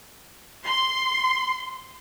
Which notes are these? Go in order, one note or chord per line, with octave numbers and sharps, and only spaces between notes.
C6